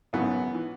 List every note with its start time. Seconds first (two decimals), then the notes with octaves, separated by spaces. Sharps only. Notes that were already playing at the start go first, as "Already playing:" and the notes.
0.13 G#1 F#2 C#3 E3 B3
0.55 E3